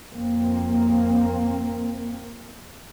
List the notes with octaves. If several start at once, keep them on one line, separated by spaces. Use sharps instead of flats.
F2 A#3 C4